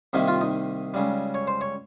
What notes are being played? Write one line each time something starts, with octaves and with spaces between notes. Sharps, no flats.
C2 C3 D#3 A#3 D#4
F4
D#4
C#2 C#3 G3
C#5
C5
C#5